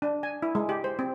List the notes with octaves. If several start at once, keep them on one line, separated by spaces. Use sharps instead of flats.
D4
G#5
E4
G#3
G4
C5
C4